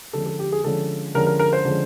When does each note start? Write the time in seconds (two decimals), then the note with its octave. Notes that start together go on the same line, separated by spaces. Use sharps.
0.13 D3 F3 G#3 C#4 A4
0.26 A4
0.39 G4
0.52 G#4
0.64 D3 F3 G#3 C#4 A4
1.14 D3 F3 G#3 C#4 A#4
1.27 A#4
1.39 A#4
1.53 C5
1.65 D3 F3 G#3 C#4